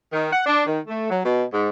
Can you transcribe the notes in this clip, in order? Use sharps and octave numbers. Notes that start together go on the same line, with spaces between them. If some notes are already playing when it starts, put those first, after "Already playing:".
D#3
F#5
D4
D#3
A3
F#3
B2
G#2